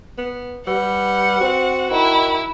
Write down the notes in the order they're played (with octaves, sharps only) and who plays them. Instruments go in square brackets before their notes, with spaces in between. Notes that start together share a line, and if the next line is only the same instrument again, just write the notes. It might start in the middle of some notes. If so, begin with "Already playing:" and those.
[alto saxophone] B3
[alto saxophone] G3 [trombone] B4 [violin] F#5
[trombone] C4 [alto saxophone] F#4
[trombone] D#3 [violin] E4